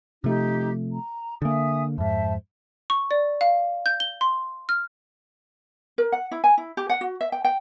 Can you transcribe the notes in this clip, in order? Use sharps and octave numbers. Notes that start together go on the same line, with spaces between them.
C3 F3 A3 D#4 G4
A#5
D3 A#3 E5 G#5 D#6
F2 G#2 C5 E5 A5
C#6
D5
F5
G6
G7
C6
F6
A#4
F#5
E4
G#5
E4
G4
F#5
F#4
E5
G5
G5